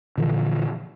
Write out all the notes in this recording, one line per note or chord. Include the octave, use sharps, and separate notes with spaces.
A#2 D3 E3 F3